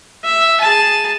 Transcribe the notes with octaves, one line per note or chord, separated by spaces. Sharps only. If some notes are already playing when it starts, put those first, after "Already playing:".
E5
G#4 A5